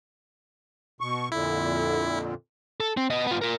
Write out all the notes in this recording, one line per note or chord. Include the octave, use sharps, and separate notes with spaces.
B2 C#6
F2 A#2 D3 E4
A4
C4
B3 D#5
B3 F4
F4 A#4